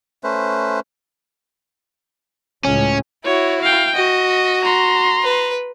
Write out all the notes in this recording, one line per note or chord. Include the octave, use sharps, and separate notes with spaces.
A3 C#4 B4 C5
C#2 A2 C#4
E4 F#4 C#5
F5 G5
F#4 D#5
A#5 C6
B4